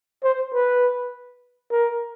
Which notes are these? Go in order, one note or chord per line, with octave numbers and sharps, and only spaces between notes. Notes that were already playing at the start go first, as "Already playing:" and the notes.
C5
B4
A#4